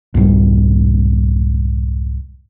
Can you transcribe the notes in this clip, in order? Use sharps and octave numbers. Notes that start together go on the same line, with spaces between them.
C2 F2 G#2 G3